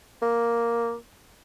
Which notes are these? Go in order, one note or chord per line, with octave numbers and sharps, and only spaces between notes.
A#3